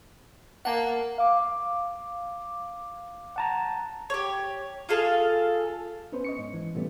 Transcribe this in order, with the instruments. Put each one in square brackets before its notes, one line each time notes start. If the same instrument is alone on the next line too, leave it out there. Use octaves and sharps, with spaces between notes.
[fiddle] A#3 [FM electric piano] F#5 A5
[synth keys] F5 D6
[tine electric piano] F#5 A5 A#5
[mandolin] G4 C#5
F4 G#4 A4 F5
[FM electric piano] B3 C#4 B4 C5
D#5 C#6 C#7
G#2
E3
A2 C3 G3 A3 B3 C#4